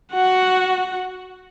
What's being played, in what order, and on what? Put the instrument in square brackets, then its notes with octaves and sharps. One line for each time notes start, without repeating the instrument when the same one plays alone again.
[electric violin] F#4 F#5